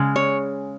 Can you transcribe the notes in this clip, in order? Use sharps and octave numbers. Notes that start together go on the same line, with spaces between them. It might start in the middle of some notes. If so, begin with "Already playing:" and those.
Already playing: C#3 G#3
C#5